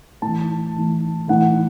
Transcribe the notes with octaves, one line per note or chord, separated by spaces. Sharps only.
A2 E3 A5
A2 E3
A2 E3 F#5